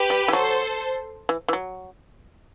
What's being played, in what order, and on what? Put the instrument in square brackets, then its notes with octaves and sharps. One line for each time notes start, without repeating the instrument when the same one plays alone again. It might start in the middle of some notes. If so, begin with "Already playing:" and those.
Already playing: [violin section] G4 B4
[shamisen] G3
E3
[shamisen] F#3 [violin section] A4 C5
[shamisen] E3
E3
F#3